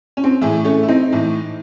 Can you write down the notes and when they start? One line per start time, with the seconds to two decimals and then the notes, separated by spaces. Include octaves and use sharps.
0.17 C#4
0.24 C4
0.41 A2 E3 E4 G#4
0.65 A3 C#4
0.83 E4
0.88 C4 D#4
1.12 A2 E3